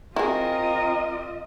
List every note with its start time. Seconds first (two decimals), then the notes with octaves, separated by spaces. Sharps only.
0.16 C4 E4 F4 G#4 A#4 D#5